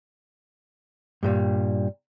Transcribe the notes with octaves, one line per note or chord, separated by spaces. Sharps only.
G2 A#2 G3